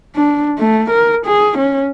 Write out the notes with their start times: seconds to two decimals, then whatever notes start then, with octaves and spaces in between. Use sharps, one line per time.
0.16 D4
0.59 A3
0.91 A#4
1.26 G#4
1.58 C#4